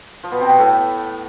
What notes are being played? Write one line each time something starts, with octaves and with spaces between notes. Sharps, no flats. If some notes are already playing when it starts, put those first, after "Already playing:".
F3
B2 B3
C3 C4
B2 B3
A2 A3